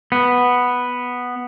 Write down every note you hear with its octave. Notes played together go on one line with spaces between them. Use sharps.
B3